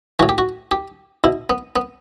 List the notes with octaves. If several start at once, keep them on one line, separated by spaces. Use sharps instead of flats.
A2 E3 F#4
G4
F#4
G4
B2 E4
B3
B3